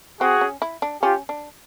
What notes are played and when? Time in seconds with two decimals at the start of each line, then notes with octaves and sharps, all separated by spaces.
0.21 C4 F#4 G#4
0.41 C#4
0.62 E4
0.82 D4
1.02 C#4 F4 G4
1.29 D4